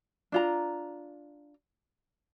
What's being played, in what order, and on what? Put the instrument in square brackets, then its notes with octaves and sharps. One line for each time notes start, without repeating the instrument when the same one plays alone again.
[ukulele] D4 F4 A#5